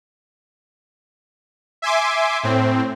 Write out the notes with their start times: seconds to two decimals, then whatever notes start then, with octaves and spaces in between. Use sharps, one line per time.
1.82 E5 G#5 C6 D6
2.43 A2 C4